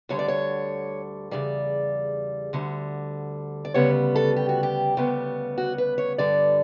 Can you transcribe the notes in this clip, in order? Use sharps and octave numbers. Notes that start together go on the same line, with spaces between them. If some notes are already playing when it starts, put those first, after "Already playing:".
D2 D3 G3 C#5
D5
C#5
E2 C#3 G3 D5
D2 D3 G3
D5
D2 C#3 G3 B3 C#5
A4
G4
F#4
G4
D2 C#3 G3 B3
F#4
B4
C#5
G2 D3 G3 D5